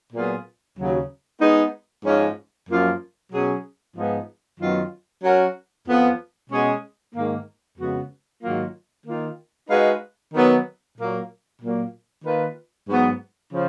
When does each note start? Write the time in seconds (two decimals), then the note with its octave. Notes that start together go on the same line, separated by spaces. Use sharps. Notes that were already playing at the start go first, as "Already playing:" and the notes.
0.13 A#2 F#3 B3 F4 G#4
0.78 D#2 C#3 F#3
1.41 G#3 B3 D#4
2.05 G#2 F3 G#3 C#4
2.69 F#2 F3 A#3 F4
3.32 B2 F#3 C#4 G#4
3.97 G#2 F3 B3 D#4 G#4
4.60 F#2 D#3 F#3 B3 F4
5.23 F#3 C#4 F#4 A#4
5.87 F2 F3 B3
6.50 B2 G#3 C#4 G#4
7.14 G#2 D#3 A#3
7.78 F2 C#3 G#3 B3 F#4
8.42 G#2 D#3 F#3 A#3 F4
9.06 D#3 A#3 F4
9.69 G#3 D#4 F#4 B4 F5
10.34 D#3 F#3 B3
10.97 A#2 F#3 A#3
11.61 A#2 F#3 A#3
12.25 D#3 A#3 F4 B4
12.89 G#2 F#3 B3
13.52 C#3 F3